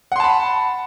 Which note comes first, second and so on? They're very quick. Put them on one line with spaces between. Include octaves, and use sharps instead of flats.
F#5 C6 A5 B5